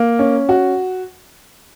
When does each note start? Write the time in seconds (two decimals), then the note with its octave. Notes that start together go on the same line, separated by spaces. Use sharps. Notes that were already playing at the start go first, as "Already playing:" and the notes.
Already playing: A#3
0.19 C#4
0.49 F#4